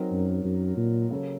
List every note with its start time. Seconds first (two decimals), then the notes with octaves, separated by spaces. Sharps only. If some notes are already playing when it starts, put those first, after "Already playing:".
Already playing: F#3 C4 D#4 A#4
0.11 F#2
0.45 F#2
0.77 A#2
1.10 C#3 F#3 A#3 C#4 A4